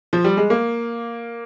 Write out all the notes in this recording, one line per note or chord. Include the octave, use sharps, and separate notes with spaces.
F3
G3
G#3
A#3